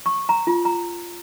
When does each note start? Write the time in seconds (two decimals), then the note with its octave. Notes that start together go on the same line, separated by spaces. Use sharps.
0.06 C#6
0.29 A#5
0.47 F4
0.65 A#5